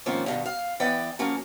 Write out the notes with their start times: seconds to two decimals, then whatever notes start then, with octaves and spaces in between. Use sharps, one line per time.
0.06 G#2 D#3 F3 A#3 C4 C#4
0.26 G2 B2 D#3
0.46 F5
0.80 E3 B3 B4 D5 G5
1.19 F3 F#3 A#3 C#4